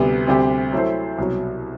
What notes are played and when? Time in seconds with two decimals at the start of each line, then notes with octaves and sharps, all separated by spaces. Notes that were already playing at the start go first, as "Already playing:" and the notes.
Already playing: D2 C3 G3 B3
0.27 D2 C3 G3 C4 G4
0.72 F#3 A3 E4 A4 C5
1.18 C2 B2 F#3